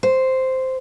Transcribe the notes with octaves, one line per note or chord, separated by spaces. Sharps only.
C5